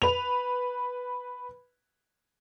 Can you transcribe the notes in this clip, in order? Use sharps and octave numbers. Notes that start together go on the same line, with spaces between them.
B4 F7